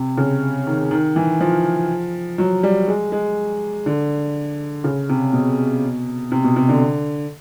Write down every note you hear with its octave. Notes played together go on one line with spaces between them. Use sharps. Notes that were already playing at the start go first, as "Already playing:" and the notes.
Already playing: C3
C#3
D#3
D#3
E3
F3
F#3
G3
G#3
G#3
D3
C#3
C3
B2
C3
B2
C3
D3